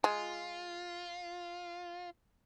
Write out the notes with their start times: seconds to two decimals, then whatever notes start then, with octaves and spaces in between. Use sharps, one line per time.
0.04 G#3 F4